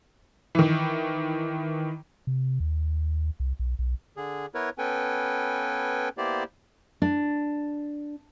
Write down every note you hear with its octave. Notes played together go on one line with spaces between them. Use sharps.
D#3 E3
C3
D#2
C2
B1
B1
D3 G#4
B3 E4 A#4 B4 C#5
B3 C#4 A4 B4 G5 G#5
A#3 B3 E4 G4 C5 D5
D4